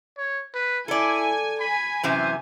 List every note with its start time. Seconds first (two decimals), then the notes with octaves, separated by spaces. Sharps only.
0.18 C#5
0.54 B4
0.88 E4 A4 D5 G#5
1.60 G#5 B5
2.03 F#2 C3 E3 C5